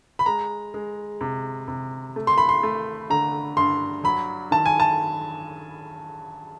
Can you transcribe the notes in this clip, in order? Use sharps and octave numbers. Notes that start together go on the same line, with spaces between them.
B5
G#3 A#5
G#3
C3
C3
A3
C6
B5
C6
A3
D3 A#5
G2 C6
F#3 B5
D#3 A5
G#5
A5